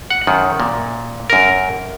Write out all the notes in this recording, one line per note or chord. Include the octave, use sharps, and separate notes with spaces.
F#5
F#2 D#3
A#2
F#2 A#4